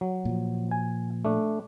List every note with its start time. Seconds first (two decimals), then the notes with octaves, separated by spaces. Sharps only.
0.01 F#3
0.25 A#2 F3
0.71 G#5
1.25 A3 D4